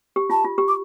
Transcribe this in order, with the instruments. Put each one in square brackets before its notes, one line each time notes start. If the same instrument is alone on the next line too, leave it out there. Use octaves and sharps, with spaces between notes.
[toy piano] G4
[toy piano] F4 [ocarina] A5
[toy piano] F4
G4
[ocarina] D6